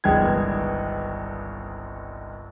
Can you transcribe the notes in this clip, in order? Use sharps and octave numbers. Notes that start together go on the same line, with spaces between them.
G1 C2 D#3 G#3 B3 G#6